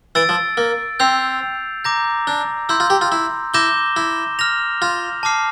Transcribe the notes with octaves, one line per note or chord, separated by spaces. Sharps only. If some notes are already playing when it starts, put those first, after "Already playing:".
E3 E6 A6 D7
F3
A#3
C4 E6 G6 C7 F7
A#5 D6 G6 A#6
D4
E4 C6 E6 G6
F4
G4
F4
E4
E4 D6 G6 A#6 E7 G7
E4
F6 A#6 F7
F4
A5 D6 F6 C7